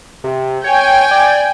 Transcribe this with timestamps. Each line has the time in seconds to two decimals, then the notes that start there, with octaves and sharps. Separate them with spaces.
0.24 C3
0.64 C#5 G5 G#5
1.11 D5